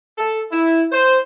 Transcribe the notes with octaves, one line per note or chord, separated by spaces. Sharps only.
A4
E4
C5